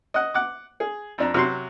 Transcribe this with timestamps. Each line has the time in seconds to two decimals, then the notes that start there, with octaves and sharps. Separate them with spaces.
0.14 D#5 F#5
0.34 F#5 D6
0.80 G#4
1.18 F2 D4 A#5
1.34 C3 F#3 C6